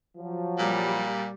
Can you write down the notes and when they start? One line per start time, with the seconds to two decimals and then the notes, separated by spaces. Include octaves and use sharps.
0.17 F3 F#3
0.58 A#2 G3